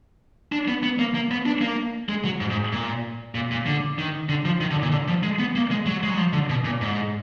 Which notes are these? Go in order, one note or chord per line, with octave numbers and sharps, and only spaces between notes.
D4
B3
B3
A#3
A#3
B3
D4
A#3
G#3
F#3
G#2
G#2
A#2
A#2
A#2
D3
D#3
D3
F3
D#3
D3
A#2
D3
F3
G#3
B3
A#3
G#3
F#3
G#3
F#3
F3
D3
B2
A#2
G#2